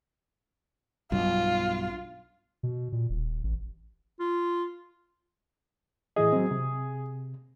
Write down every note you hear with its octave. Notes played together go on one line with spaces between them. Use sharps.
B1 G2 F4
B2
A#2
D#1
A1
F4
A2 E3 G#4 D#5
F#3 C4
C3